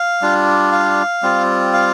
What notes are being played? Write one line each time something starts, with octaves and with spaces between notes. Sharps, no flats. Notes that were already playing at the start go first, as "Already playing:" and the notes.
Already playing: F5
G3 D4 F4
F5
G3 C4 F4
F5